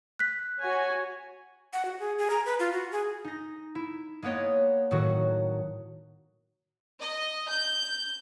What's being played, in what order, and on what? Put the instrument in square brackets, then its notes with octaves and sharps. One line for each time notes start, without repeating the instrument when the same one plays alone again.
[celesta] F#6 B6
[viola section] F#4 C#5 G#5
[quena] F#5
F#4
G#4
G#4
A#5
B4
F4
F#4
G#4
[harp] D#4 A#6
E4
G#3 A#3 B3 C#5 D#5
A2 D#3 F#3 F#4
[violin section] D#5
G6